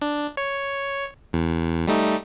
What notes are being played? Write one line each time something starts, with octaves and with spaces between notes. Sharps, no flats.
D4
C#5
E2
G3 A3 D#4